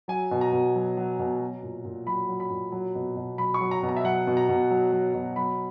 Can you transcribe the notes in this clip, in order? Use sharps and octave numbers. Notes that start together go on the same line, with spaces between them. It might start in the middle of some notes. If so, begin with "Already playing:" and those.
F#3 G#5
B2
A#5
B2
F#3
F#3
B2
F#3
A#2
A#2
F#3 B5
F#3
B5
A#2
F#3
B2
B2
F#3 B5
C#6
F#3
A#5
B2
A#5
E5
F#3 F#5
B2
A#5
B2
F#3
F#3
B2
F#3 B5